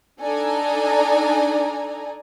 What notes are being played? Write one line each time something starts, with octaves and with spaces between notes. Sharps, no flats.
D4 D#4 A4 D5 G#5 A#5